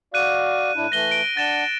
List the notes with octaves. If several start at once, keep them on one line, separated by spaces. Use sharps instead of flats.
F#4 D5 F5 F#6 D#7
A2 D4 E4
E3 A3 A#6 G7
D7
D4 F#5 A6 E7 G7